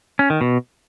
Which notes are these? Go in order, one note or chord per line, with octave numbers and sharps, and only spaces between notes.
C#4
D#3
B2